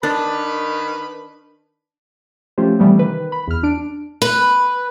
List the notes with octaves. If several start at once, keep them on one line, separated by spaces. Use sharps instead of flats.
D#3 D4 B4 B5
F3 A3 C#4 F4 G4 C5
C3 E3 F3 G3 A3 B3
D#3 B4
B5
E2 F6
D4 D7
B4